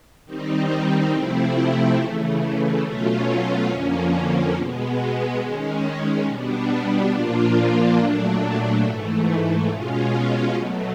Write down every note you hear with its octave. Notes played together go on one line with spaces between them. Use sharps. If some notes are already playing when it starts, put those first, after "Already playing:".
D#3 G3 C4 D#4
C3 F3 A3 C4 E4
C#3 E3 A3
B2 F#3 A3 C#4 F4
F2 D3 F3 A#3 C#4
B2 G#3 B3
D#3 G#3 C#4
B2 G3 B3 D4
A#2 F3 A#3 D4 F4
A#2 F#3 A3 D4
G#2 E3 A3
B2 G#3 C#4 F4
B2 F#3 A3